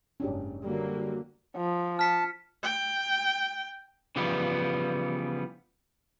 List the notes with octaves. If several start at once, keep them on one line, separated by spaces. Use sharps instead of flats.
F#1 G#2 C#4 D4 G4
D3 F#3 G3 A#3
F3
A5 F6 B6 C#7
G5
C#3 E3 F3 G3 B3